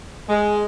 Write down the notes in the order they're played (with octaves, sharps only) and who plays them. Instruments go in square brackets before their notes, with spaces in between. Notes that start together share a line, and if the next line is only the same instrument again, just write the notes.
[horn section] G#3